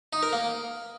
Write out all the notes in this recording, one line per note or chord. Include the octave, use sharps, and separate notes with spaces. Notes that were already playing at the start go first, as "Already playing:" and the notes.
D#4
A#4
A#3